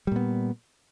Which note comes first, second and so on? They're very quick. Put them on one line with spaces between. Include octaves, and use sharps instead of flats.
G3 A#2 B3